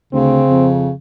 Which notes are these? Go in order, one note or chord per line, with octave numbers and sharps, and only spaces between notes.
D2 C#3 C4
F2